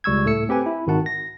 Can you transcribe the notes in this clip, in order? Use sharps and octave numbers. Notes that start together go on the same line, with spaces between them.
C#2 G3 C#6 E6 G#6
A2 A3 A4 E6 C#7
C4 G4 B4 G#5
E4
G#1 D#3 F#4 F#5 A5
A#6